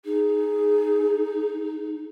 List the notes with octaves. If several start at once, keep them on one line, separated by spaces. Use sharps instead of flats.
D#4 G#4